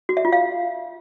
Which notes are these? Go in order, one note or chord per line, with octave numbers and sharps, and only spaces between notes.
F#4
E5
F4
F5